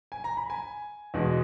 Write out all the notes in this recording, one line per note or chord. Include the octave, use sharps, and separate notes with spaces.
G#5
A#5
B5
G#5
E2 B2 G#3